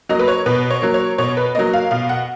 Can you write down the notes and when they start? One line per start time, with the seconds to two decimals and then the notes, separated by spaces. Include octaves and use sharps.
0.09 F#3 A#3 D#5
0.19 B4
0.28 C#5
0.46 B2 B4
0.70 C#5
0.82 F#3 A#3
0.94 C#5
1.18 B2 C#5
1.37 B4
1.55 F#3 A#3 D#5
1.73 F5
1.91 B2 F5
2.09 F#5